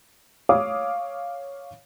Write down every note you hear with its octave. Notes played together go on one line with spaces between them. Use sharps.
C#5 F5 D6 D#6